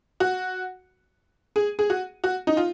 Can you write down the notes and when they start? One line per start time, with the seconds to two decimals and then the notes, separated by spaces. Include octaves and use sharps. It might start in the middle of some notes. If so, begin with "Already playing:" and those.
0.20 F#4
1.56 G#4
1.79 G#4
1.90 F#4
2.24 F#4
2.47 D#4
2.57 F4